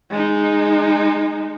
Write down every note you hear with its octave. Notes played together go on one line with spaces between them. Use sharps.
G#3 D#4